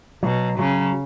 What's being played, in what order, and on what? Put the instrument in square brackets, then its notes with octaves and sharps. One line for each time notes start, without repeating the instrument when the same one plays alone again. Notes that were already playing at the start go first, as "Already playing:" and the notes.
[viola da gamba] B2 [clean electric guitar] F#3
[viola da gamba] C#3 [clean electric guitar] F#3